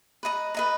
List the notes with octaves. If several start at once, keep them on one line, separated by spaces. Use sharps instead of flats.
B4 D#5 A#5
B4 D#5 A#5